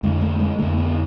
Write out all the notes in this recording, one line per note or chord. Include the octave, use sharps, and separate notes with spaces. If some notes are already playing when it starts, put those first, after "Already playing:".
F2 D3 G#3
A3
G#3
F2 D3 A3
B3